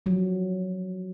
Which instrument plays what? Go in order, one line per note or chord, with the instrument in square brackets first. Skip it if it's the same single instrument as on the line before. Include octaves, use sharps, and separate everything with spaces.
[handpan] F3 F#3